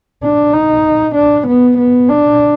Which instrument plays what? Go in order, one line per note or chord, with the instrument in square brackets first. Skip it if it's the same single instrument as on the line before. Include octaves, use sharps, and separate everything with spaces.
[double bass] D4
D#4
D4
B3
B3
D4